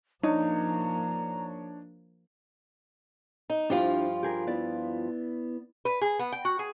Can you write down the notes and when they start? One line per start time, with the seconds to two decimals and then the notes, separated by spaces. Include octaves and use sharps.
0.23 F3 A#3 D4 D#4 C#5 A#5
3.50 D#4
3.70 G2 F3 D4 E4 F4 C5
4.23 G4 G#4 A#4
4.47 B3 E4 D5
5.85 B4
6.01 G#4
6.19 B3
6.32 G5
6.45 F#4
6.59 G#4